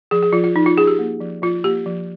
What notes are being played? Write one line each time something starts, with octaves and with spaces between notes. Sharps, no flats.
F3 G#4
G#4
F3 F4
F4
F3 D#4
F4
C#4 G#4
G4
A#3
F3
F3 F4
A#3 G4
F3